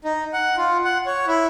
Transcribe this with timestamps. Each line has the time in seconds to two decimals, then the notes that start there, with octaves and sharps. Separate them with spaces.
0.04 D#4
0.33 F#5
0.57 F4
0.84 F#5
1.06 C#5
1.27 E4